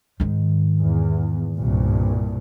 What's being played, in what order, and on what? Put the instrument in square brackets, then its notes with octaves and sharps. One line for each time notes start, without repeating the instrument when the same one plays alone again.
[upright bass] G#2 D#3
[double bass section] E2
C2 G2 A#2